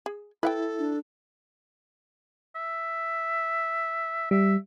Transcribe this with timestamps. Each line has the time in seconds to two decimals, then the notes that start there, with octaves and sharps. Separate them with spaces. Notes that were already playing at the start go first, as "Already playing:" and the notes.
0.06 G#4
0.43 E4 A4 B4 F#5 G5
0.79 D4
2.55 E5
4.31 G3 E5